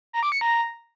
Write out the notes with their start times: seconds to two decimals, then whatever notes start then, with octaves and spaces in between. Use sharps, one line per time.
0.13 A#5
0.23 D6
0.32 C#7
0.41 A#5